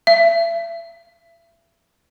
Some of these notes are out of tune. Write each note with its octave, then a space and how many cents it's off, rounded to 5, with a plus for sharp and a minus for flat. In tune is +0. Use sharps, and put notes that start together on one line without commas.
E5 +35